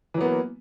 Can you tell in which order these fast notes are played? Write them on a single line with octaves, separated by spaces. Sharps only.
E3 F#3 B3 A#3